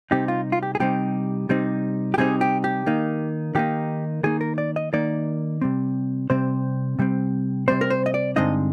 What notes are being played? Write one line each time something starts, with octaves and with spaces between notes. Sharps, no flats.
C3 G3 C4 D#4 G4
F4
F4
G4
G#4
C3 G3 C4 D#4 G4
C3 G3 C4 D#4
G4
C3 G3 C4 D#4 G#4
G4
G4
D#3 A#3 D#4
D#3 A#3 D#4 G4
D#3 A#3 D#4 G#4
A#4
D5
D#5
D#3 A#3 D#4 D5
C3 G3 C4
C3 G3 C4 C5
C3 G3 C4
C3 G3 C4 C5
A#4
C5
D#5
D5
G2 D3 G#3 C4 D#4 D#5